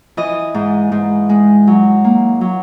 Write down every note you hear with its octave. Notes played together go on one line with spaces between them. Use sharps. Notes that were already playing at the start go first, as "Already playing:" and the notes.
E3 D#5
G#2
G#2
G#3
F#3
A#3
F#3